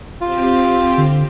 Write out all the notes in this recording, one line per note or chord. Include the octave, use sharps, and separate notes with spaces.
C4 F4 G4
D3